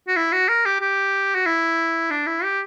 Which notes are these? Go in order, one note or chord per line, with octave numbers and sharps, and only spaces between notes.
F#4
E4
F#4
A#4
G4
G4
F#4
E4
D4
E4
G4